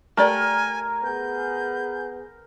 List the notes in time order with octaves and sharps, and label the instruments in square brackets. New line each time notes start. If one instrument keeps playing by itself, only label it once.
[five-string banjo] A3 G4 D5 [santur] A#4 [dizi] G#5
[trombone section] B3 G#4 [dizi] G6